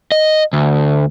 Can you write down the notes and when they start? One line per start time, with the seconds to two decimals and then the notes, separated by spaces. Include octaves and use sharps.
0.12 D#5
0.53 D2